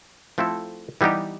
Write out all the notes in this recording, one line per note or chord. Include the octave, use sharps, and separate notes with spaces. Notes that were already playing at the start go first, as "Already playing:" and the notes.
F3 A3 C4 E4 A4
E3 G3 B3 D#4 G4